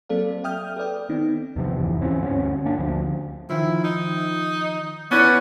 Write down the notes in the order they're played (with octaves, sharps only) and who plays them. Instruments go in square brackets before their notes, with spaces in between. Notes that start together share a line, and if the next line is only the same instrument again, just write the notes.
[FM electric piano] F#3 A#3 C4 A4 D5 F5
E5 G5 D#6 F6 G6
A4 B4 D5 G5
D#3 B3 C4 D#4
[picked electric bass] E2 C3 F3
F1 D#2 G#2 E3
E3 C4 C#4
D2 G2 A3 C#4
A#3 D4
D2 F3
[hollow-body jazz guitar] D#3 F3 [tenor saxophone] E4
[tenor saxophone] D#4
[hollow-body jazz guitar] B3 E4 C#5 [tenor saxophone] C#4 [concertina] B4 D5 F#5